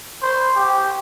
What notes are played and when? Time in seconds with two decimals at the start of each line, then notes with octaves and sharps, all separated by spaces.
0.22 C5
0.56 G4